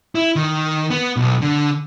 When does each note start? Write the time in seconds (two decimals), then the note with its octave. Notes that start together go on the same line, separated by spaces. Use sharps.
0.15 E4
0.36 D#3
0.90 B3
1.16 B1
1.42 D3